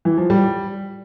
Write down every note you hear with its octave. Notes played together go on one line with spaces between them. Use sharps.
E3
F3
G3